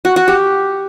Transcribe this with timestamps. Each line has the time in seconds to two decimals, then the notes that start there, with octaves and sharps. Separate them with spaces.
0.05 F#4
0.16 F#4
0.28 G4